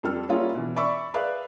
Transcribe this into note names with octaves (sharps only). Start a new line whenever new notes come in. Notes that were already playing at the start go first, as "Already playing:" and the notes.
F2 G3 A4 F6
G3 A#3 C#4 E4 F4 G#4
B2 E3
D5 E5 B5 C#6 E6
G#4 B4 D5 E5 F5 F#6